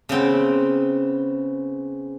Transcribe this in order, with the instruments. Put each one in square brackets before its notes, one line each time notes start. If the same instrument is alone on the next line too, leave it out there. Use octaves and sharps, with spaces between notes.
[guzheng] C#3 B3 C4